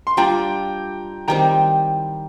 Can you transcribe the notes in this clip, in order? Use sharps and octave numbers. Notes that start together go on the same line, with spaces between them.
C6
G3 D4 F4 G5 A#5
D#3 G3 C4 G5 A#5